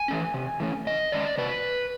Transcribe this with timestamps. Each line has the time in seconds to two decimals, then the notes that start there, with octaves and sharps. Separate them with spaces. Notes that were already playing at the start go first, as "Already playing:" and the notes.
Already playing: G#5
0.08 E3 A3 C#4
0.34 C3
0.60 E3 A3 C#4
0.87 C3 D#5
1.12 D#3 G#3 C#4 D5
1.38 C3 B4